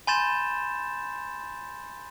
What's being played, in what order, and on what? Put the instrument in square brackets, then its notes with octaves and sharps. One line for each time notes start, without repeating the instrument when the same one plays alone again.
[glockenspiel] G#5 B5 C6 G6 A6 E7